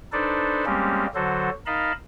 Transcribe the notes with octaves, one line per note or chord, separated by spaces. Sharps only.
D4 D#4 A4 B4 C5 D5
G3 G#3 A#3 C4 C#4 G4
D3 F#3 F#4 A4 C5
D#4 A#4 D#5 F5 A5 B5